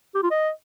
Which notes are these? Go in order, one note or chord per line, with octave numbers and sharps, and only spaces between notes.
G4
F4
D#5